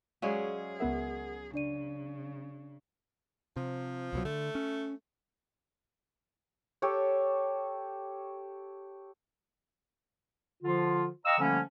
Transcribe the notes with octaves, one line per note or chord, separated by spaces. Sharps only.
F#3 G#3 C#4 G#4 C#5 D5 F5
C#2 B3 A#4 E5 F#5
C#3 D4 D5 D#7
C3 F3
C2 B2 F#3
D3 A3
C#4
G4 A4 C#5
D3 F3 F4
D#5 F5 G5 A#5 C#6 E6
D3 F3 G3 A3 A#3 C#4